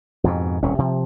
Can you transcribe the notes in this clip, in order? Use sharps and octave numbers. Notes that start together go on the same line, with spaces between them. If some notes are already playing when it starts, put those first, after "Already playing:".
F2 G#2 B2
D#1 C2 A#2 C#4
C3 F3